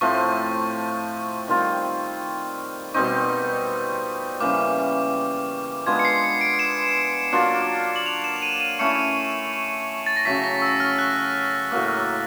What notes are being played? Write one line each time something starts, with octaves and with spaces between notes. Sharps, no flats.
A2 F3 A3 C4 C#6
D#3 G3 C4 F4
B2 G3 C4 D#4 C#6
C#3 E3 G3 A#3 D6
G#3 B3 D4 F4 G#6
C#7
C7
C#7
D7
E7
F#3 A#3 D4 F4
F#7
F7
E7
D#7
D#7
A3 C#4 E4 C#7
A6
A#6
C#3 F#3 A3 B6
A#6
E6
F6
F#6
A2 F#3 A#3